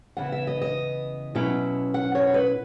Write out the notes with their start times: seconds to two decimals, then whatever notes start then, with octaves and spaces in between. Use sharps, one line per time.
0.17 C#3 E3 B3 E4 F#5
0.32 E5
0.47 D#5
0.61 D#5
1.35 B2 F#3 C#4 E4
1.94 F#5
2.15 C#5
2.34 B4